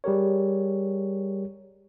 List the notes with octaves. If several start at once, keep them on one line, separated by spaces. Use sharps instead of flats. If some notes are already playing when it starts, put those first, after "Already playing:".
G3 G4 G#4 A#4 C#5